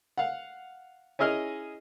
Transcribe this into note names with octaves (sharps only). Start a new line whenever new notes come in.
F5 F#5
C#4 E4 G#4 D#5 F6